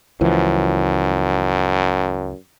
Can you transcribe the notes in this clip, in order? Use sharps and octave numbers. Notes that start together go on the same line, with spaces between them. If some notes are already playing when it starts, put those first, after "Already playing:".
C#2 F#2 E3 F3